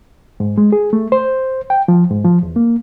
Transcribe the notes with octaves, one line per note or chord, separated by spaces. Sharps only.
G#2
G#3
G#4
A3
C5
G5
F3
G#2
F3
E2
A#3